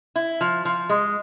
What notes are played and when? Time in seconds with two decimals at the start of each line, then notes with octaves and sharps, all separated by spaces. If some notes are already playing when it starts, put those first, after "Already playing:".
0.16 E4
0.41 F3
0.65 F3
0.90 G#3